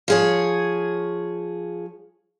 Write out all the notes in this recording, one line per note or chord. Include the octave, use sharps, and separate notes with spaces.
F3 G#4 C#5